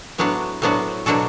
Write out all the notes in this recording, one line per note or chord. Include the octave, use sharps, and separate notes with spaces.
A2 F#3 B3 D4 F#4
A2 F#3 B3 D4 F#4
B2 F#3 D4 F#4 A4